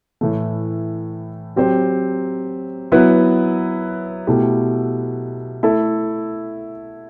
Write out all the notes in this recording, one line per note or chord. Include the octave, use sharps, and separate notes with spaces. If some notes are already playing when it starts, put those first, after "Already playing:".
A2 E3 A3
F#3 C4 G4 C5
F#3 B3 E4 B4
B2 A3 E4 G4
A3 E4 A4